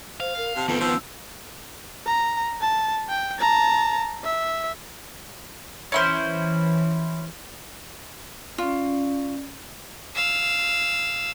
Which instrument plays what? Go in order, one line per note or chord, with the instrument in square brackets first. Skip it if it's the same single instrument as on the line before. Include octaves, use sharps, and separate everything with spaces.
[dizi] C5 [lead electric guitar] F5
[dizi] A#4
[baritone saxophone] C3 [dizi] A5
[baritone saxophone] F2 [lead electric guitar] D#3 C4 [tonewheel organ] B3
[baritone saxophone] F3 [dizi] E6
[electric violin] A#5
A5
G5
A5 A#5
E5
[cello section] E3 [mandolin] C#4 E4 C5
[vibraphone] C#4 D5 [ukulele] F4
[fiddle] F5 E6